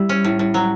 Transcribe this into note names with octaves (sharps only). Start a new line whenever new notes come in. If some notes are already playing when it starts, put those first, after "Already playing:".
Already playing: G3 E4
C#4
A2
A2
F#3